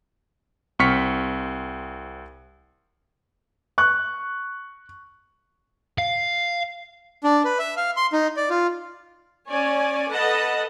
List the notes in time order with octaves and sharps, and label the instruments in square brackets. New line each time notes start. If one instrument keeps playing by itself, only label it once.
[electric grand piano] C2 C4 C#6 F6 B6 C#7
[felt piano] C#6 F#6
[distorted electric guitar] F5
[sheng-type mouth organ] D4
B4
E5
F5
C6
D#4
D5
F4
[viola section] C#4 C#5 D5 G#5
A4 B4 D#5 F#5 A5